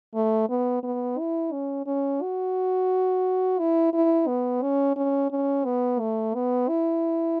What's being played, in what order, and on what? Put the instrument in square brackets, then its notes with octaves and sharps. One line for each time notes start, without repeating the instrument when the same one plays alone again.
[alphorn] A3
B3
B3
E4
C#4
C#4
F#4
E4
E4
B3
C#4
C#4
C#4
B3
A3
B3
E4